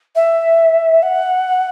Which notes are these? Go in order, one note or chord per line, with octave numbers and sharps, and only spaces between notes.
E5
F#5